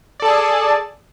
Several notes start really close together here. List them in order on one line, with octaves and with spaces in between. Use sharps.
D5 A4 A5 G#4